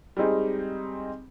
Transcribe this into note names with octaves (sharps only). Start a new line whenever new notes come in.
G3 G#3 C4 D#4 G#4